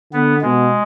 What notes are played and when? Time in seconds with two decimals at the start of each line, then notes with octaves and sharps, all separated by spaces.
0.12 D3 B3
0.41 B2 G#3